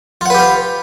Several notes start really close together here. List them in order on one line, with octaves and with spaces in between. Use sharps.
F4 F#5 B4 G4 F5